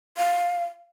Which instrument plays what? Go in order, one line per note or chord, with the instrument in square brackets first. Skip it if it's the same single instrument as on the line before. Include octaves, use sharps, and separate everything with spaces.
[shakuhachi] F5